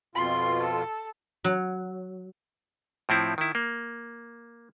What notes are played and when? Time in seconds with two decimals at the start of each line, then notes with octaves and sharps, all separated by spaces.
0.15 F2 B2 F4 C6
0.63 A4
1.44 F#3
3.09 A2 F3 C4 E4
3.38 D#3 E4
3.55 A#3